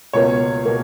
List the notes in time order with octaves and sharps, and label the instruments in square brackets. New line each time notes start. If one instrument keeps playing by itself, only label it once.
[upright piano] C#2 B2 A#3 C#5
B2 A#3